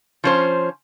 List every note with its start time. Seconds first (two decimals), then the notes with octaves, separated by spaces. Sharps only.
0.24 F3 C#4 C5